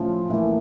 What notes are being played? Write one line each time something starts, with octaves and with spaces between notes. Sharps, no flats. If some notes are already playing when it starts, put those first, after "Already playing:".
Already playing: A2 F3 C#4 F4
A2 E3 A#3